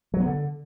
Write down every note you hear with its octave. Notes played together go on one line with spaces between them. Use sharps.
F#3
B3
D3